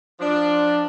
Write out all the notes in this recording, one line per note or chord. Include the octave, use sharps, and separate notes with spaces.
F3 D4